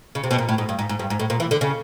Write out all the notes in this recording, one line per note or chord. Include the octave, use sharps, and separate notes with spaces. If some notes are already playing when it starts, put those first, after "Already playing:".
C#3
C3
B2
A#2
A2
G#2
G2
G#2
G#2
G2
G#2
A2
A#2
E3
D3
C#3